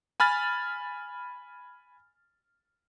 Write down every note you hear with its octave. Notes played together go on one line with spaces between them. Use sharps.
G#5 B5 F6 A6